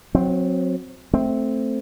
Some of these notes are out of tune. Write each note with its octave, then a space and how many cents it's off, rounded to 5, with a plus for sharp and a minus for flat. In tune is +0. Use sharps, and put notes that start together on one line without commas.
F#3 -20 C4 +0
A3 +0 C4 +0